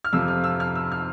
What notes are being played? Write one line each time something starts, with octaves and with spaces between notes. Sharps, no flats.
F6
F2 C3 F3 E6
F6
E6
F6
E6
F6